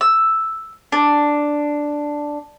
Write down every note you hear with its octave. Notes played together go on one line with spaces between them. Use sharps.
E6
D4